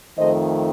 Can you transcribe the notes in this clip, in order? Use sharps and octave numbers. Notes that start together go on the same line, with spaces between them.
F2 D#3 A3 C5 D#5